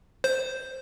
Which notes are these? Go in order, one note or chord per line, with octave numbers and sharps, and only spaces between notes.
C5